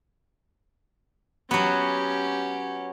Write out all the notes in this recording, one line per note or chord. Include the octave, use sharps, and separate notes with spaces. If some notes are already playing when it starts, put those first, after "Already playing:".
F#3 B3 C#4 G4